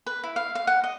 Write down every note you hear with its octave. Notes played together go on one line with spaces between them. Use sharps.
B4
E4
F5
F5
F#5
D#5